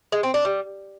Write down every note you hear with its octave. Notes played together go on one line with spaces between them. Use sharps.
G#3
C4
D4
G3